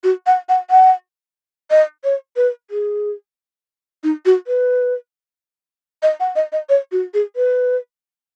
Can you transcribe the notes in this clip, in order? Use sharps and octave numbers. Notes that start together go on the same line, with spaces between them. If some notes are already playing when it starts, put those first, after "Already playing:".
F#4
F#5
F#5
F#5
D#5
C#5
B4
G#4
D#4
F#4
B4
D#5
F#5
D#5
D#5
C#5
F#4
G#4
B4